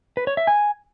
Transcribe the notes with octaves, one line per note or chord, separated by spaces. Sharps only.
B4
C#5
E5
G#5